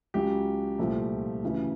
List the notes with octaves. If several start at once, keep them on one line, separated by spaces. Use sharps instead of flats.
C#2 C#3 F#3 G4
C2 A#2 F3 A3
D2 C#3 E3